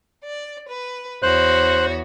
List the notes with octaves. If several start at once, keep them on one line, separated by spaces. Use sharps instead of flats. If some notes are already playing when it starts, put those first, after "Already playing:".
D5
B4
E2 F#4 C5 C#5 F#6